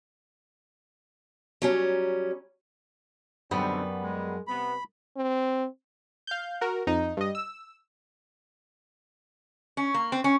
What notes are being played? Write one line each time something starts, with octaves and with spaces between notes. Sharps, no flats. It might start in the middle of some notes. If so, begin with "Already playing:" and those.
F#3 G3 C#4
F#2 B2 D3 G3 B3 C4
G#3
C3 B3 B5
C4
F5 G6
F#4 A#4
F2 D#4
G2 D#5
E6
C#4
A#3
C4
C#4